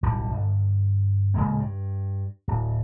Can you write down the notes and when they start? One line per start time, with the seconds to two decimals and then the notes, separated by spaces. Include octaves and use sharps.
0.03 D1 B1 D3 G3
0.31 G1
1.34 D1 C#3 G#3 A#3
1.59 G2
2.48 D1